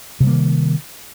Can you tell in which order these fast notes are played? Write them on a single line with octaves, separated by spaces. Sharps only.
C3 G3 A#3 D#3